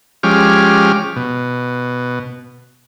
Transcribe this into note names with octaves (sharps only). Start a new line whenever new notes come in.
F3 G#3 C#4 G4 D6 F6
B2